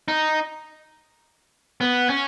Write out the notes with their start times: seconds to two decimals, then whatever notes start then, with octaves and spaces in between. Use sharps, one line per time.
0.08 D#4
1.81 B3
2.09 C#4